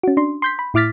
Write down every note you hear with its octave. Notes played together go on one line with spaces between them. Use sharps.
C#4 F#4
D4 C6
C6 G6 B6
B5
A2 E4 D6 F6 A6 B6